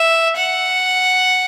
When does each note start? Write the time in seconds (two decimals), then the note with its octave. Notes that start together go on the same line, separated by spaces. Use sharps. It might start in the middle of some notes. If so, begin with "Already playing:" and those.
Already playing: E5
0.36 F#5